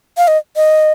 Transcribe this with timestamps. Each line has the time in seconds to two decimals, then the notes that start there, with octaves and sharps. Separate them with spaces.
0.18 F5
0.28 D#5
0.56 D#5